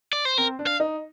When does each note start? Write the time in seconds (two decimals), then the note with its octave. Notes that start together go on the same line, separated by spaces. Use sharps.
0.13 D5
0.25 C5
0.38 C4 A#4
0.59 D4
0.67 F5
0.80 D#4